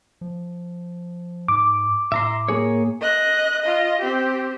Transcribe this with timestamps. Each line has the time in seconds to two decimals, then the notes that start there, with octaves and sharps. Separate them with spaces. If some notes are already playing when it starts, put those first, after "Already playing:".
0.21 F3
1.48 G#2 D6
2.12 A2 E5 A#5 C6
2.48 A#3 G#4 C#5
3.00 D#5 F#6
3.61 F4 D#5
3.99 C4 G4